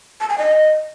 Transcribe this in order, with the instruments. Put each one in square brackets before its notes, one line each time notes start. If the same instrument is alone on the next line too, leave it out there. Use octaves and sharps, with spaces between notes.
[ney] A5
G#5
D#5